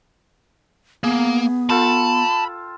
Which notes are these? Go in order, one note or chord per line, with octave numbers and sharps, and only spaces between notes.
A#3 B3 G#4
F4 A4 G5 A5 B5